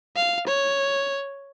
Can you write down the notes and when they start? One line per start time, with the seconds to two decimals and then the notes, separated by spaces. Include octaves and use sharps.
0.16 F5
0.47 C#5